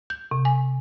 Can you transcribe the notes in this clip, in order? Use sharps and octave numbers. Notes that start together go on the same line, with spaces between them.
G6
C3
G#5